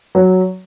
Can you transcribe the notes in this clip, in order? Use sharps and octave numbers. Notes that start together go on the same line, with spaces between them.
F#3